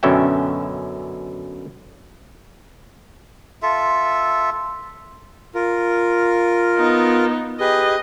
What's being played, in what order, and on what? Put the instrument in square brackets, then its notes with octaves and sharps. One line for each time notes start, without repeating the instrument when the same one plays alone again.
[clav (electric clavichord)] F#2 B2 D3 C#4 E5 G5
[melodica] F4 A4 E5
[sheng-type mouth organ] F4 A#4
[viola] B3 D#4
[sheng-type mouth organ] G4 G#4 B4 [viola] D#5